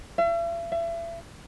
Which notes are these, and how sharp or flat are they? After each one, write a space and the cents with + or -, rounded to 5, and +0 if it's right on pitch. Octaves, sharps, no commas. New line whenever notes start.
E5 +45
E5 +35